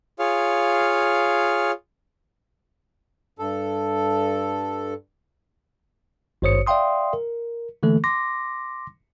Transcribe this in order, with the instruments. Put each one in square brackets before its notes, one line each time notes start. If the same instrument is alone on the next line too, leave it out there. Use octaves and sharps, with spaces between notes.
[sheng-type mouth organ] F4 G#4 C#5 F5
[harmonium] G2 A4
[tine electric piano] G#1 G2 C5 C#5 D#6 C#7
D5 E5 F5 G5 C6 D#6
A#4
D3 E3 A3 A#3 A4
C6 D6 A#6